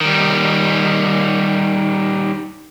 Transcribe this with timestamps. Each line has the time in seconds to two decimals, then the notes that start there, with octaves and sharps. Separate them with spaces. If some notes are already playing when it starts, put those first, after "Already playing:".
0.01 D#3 G3